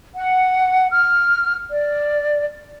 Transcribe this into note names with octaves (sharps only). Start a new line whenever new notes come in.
F#5
F6
D5